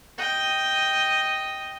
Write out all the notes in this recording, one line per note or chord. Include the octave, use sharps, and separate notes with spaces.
D#5 G5